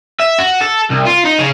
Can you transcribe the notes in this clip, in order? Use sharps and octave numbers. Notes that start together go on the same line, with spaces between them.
E5
F#4
A4
C2
F4
D#4
C#3